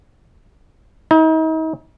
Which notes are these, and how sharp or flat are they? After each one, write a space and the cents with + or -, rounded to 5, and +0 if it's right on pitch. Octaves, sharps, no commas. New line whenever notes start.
D#4 +40